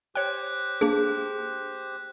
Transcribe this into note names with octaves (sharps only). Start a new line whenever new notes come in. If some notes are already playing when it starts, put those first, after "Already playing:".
G4 C5 C#5 G5 F#6
A#3 D4 G#4